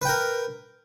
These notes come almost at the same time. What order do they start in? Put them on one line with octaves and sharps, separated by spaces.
B4 G5 A#4